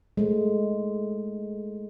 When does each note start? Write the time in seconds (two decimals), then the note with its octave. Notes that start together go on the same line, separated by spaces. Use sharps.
0.17 G#3 A3